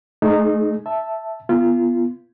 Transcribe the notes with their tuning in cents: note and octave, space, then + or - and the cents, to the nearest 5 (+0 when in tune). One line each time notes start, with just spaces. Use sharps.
A3 -25 D#4 -20 G#4 +20
E5 +0 A5 +0
B3 +0 F4 -25